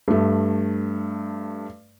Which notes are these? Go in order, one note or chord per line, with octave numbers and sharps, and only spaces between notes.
G2 A3